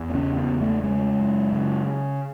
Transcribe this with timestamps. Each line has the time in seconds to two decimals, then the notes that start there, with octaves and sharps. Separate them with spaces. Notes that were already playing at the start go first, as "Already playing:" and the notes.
Already playing: E2
0.10 B3
0.14 C#3 C#4
0.37 B3
0.48 E2
0.61 A3
0.83 C#3 G#3
1.19 F#2
1.53 C#3